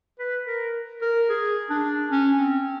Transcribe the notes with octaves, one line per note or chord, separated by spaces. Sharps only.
B4
A#4
A#4
G#4
D4
C#4
C4